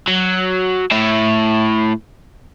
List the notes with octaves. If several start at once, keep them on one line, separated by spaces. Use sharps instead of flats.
F#3
A2 E5